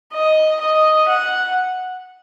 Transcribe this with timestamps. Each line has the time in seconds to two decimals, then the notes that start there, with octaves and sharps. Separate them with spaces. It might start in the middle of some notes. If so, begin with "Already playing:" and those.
0.13 D#5
0.61 D#5
1.09 F#5